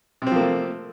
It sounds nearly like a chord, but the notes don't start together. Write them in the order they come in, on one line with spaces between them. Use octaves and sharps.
C3 C4 F3 A#3 A3